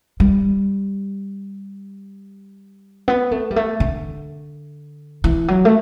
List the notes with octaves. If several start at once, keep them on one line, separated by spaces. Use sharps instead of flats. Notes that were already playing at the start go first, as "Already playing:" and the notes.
G3
B3
A3
G3
A3
D3
E3
F#3
A3